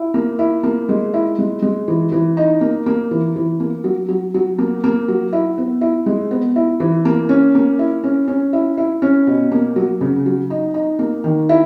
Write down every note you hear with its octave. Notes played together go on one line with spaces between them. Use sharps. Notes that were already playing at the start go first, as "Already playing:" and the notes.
Already playing: E4
A#3
E4
A#3
G#3
E4
G#3
G#3
E3
E3
D#4
A#3
A#3
E3
E3
A#3
F#3
F#3
F#3
A#3
A#3
F#3
E4
B3
E4
G#3
B3
E4
E3
A#3
C#4
A#3
E4
C#4
C#4
E4
E4
C#4
B2
A#3
F#3
C#3
F#3
D#4
D#4
A#3
D#3
E4